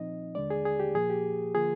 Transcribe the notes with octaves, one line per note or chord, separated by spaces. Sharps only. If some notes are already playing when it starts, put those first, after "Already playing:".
Already playing: A#2 F3 C4 D#4 D#5
D#2 D3 G#3 D4 D5
G#4
G#4
G4
A#2 F3 A#3 G#4
G4
D3 F3 A#3 F4 G#4